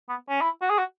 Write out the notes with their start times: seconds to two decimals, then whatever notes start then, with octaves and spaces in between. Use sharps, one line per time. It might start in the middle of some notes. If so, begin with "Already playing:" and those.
0.09 B3
0.29 C#4
0.41 E4
0.62 F#4
0.70 G#4
0.78 F#4